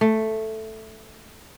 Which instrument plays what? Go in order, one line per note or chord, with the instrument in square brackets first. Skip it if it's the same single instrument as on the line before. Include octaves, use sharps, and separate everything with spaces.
[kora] A3